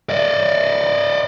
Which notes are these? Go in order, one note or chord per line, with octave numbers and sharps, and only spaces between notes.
D5 D#5